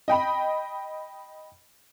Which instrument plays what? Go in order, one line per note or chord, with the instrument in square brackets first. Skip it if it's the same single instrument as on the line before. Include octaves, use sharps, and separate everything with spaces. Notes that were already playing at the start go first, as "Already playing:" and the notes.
[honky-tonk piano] D#5 G5 B5